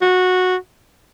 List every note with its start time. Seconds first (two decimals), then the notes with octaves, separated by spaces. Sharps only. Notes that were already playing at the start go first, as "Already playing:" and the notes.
0.02 F#4